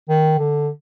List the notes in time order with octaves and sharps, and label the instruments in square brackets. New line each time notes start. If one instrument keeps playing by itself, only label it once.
[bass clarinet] D#3
D3